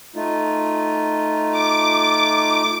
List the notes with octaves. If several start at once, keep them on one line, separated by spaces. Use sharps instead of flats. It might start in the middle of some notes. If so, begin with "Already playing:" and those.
A3 D#4 F4
D6